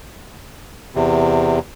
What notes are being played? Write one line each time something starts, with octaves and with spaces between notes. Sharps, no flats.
E2 C3